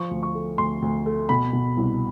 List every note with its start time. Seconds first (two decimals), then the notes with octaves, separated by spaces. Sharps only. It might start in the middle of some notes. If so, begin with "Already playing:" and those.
Already playing: F3 C#6
0.11 D2
0.23 C#6
0.35 A3
0.58 D2 C6
0.82 D2
1.06 A3
1.29 B2 B5
1.53 B2
1.77 C2